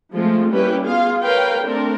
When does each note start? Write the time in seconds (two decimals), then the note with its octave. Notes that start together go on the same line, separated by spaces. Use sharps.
0.13 F3 G#3 A3 C4 F4
0.51 G3 A#3 C#4 E4 G4 B4
0.85 B3 F4 G#4 F5
1.22 A#4 B4 C#5 F5 G5
1.63 A3 C4 D4 A4 A#4